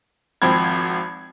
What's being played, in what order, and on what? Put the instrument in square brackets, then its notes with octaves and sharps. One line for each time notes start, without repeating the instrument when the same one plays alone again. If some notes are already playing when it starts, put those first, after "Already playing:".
[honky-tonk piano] G#1 F3 C4 B5 G#6